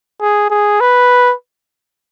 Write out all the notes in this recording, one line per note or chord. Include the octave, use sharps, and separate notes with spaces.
G#4
G#4
B4